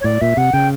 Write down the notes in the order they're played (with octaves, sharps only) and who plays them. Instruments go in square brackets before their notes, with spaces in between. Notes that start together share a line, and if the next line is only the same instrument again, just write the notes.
[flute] C#5
[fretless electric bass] A2 [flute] D5
[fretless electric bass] A#2 [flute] E5
[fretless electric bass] C3 [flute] F#5
[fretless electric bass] C#3 [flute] G5